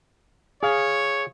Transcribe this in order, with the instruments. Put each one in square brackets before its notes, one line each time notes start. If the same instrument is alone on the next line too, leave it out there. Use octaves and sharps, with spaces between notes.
[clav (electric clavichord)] G#4 F5 [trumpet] C#5